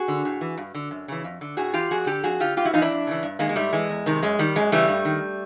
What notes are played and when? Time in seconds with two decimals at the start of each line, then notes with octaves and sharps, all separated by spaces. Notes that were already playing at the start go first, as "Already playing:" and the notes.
Already playing: F#4 G#4
0.08 D3
0.25 A2
0.41 E3
0.58 G2
0.75 D3
0.91 F#2
1.08 C#3 E3
1.24 F2
1.41 D3
1.57 A2 F#4 G#4
1.74 E3 F4 G4
1.91 F2 F#4 G#4
2.06 D3 G4 A4
2.23 F2 F#4 G#4
2.40 D3 F4 G4
2.57 G2 F4 G4
2.65 E4 F#4
2.73 E3 D#4 F4
2.82 D4 E4
2.90 F2
3.07 C#3 E3
3.23 G2
3.39 D#3 G#3 A#3
3.49 G#3
3.56 G#2 G3 A3
3.73 E3 G#3
3.89 E2
4.06 C3 D#3
4.22 F#2 G#3
4.39 D#3 G3
4.56 F#2 G#3
4.72 C#3 E3 G3 A3
4.88 G2
5.05 D#3